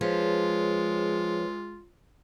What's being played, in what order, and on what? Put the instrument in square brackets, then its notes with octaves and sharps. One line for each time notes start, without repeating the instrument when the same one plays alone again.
[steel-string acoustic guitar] F3 [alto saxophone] G#3 [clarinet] F4 [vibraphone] G#4 B4 C#5